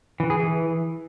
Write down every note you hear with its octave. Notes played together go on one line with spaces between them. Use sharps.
E3
G#4
E3